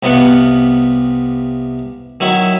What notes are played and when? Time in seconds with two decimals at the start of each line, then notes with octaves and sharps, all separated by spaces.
0.03 C2 C3 B3 F4 F#5
2.20 D#3 F#3 E4